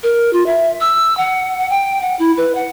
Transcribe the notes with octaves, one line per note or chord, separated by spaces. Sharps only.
A#4
F4
E5
E6
F#5
F#5
G5
F#5
E4
B4
F#5